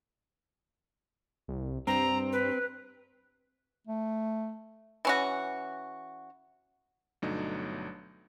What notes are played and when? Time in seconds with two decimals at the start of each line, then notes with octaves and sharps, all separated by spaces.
1.48 C2
1.87 G2 C4 A#5
2.32 B4
3.87 A3
5.05 E3 C#4 F#4
7.22 G1 B2 F#3 A3 D4 D#4